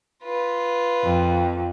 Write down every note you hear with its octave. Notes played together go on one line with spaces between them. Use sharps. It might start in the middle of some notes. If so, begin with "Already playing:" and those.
F4 B4
F2